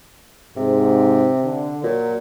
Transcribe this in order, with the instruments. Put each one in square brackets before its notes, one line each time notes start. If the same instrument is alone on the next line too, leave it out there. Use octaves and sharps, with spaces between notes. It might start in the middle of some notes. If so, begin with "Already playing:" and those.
[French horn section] G#2 [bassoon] C3
[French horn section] D3
[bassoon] A#2 [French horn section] F#3